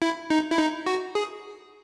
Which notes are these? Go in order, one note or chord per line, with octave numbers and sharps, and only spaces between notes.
E4
D#4
E4
D#4
F#4
G#4